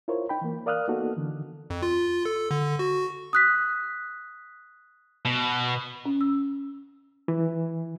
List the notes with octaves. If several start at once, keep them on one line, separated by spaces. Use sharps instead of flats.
E4 F4 A#4 C5 C#5
D#4 G5 B5
E3 A#3
A#4 D5 F5 D#6 F6 F#6
A#3 B3 D#4 F#4 A4
D3 E3
F2
F4
A4
D3
F#4
D#6 F#6 B6
B2
C#4
E6
E3